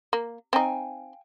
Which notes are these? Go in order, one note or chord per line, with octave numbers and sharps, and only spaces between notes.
A#3
C4 D#4 F5 G5 G#5